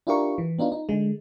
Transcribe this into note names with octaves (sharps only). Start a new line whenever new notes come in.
D4 E4 F4 G4 A#4 C#6
E3
B3 D4 D#4 F4
D#4
D3 G#3